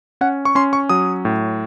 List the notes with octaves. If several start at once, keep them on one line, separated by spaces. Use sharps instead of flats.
C#4 F#5
C#6
C#4 C6
C#6
F#3 D#6
A2